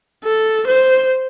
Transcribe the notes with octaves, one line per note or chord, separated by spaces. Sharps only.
A4
C5